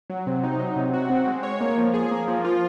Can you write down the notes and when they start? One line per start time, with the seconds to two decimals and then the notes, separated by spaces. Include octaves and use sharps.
0.10 F#3
0.27 C3
0.44 D#4
0.59 F#3
0.76 C3
0.94 F#4
1.10 C4
1.28 G#3
1.43 C#5
1.61 A#3
1.78 F3
1.94 G#4
2.11 A#3
2.28 F3
2.45 F4